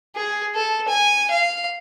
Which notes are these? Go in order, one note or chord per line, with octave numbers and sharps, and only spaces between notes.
G#4
A4
G#5
F5